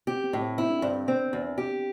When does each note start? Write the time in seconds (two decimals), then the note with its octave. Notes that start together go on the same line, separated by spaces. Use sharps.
0.07 C4 G4
0.24 C4
0.33 A2
0.41 C4
0.58 C4 E4
0.70 D4
0.82 G2 C4
1.08 C4
1.33 E2
1.58 G4